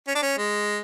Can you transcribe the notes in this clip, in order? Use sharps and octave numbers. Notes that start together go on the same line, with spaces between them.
C#4
D4
C#4
G#3